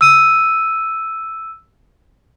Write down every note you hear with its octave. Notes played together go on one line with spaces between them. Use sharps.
E6 D#7